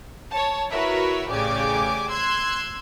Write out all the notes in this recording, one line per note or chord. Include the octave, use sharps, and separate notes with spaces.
C#5 A5
E4 F#4 A#4 B4 C#5 E5
A1 C#3 G4 D5 G#5 D6
C6 E6 F#6 G#6